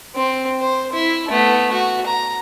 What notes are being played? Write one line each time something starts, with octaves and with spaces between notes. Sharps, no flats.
C4
C5
E4
A3 B3
F#4
A#5